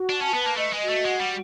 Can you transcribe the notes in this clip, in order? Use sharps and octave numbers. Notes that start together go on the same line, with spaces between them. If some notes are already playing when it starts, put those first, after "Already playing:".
Already playing: F#4
D4 A5
C#4
B3 B4
A#3
A3 D#5
G#3
F#4
A3
G#3 F#5
G3